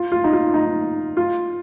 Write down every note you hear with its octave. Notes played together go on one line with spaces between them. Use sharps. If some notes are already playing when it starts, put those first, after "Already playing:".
Already playing: F4
F4
D#4
F4
D#4
F4